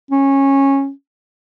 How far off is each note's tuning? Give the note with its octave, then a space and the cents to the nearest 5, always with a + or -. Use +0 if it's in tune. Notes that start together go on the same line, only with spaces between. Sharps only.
C#4 -15